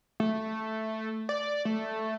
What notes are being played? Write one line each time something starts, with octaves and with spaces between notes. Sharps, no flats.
A3
D5
A3